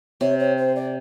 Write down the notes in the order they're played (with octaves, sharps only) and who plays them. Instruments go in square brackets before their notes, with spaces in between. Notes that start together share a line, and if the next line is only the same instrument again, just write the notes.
[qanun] C3 [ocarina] C#5
[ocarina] C#5
C5
D5